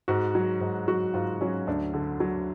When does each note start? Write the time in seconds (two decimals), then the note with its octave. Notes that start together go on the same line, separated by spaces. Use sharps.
0.08 G#2 F#4
0.35 F#3
0.61 G#2
0.88 F#3 F#4
1.14 G#2 F4
1.41 F#3 C#4
1.67 D2 D4
1.94 D3
2.20 F#3